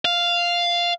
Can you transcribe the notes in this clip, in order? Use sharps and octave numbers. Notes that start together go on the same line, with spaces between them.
F5